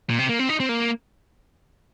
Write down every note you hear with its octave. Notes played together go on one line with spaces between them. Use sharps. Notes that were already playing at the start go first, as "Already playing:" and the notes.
A#2
C3
A#3
C4
D#4
C4
A#3